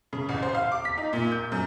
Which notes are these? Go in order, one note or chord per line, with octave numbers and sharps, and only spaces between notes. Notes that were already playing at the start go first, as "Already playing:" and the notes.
C#3
A1
C5
F5
D6
B6
D#4
A#2
G6
F#2